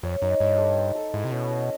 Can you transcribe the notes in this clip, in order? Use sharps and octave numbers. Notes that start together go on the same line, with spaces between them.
F2 C#5
F#2 D#4
G2 C#5
A4
C5
A4
G#2 E4
C3
B2 C#4
D#5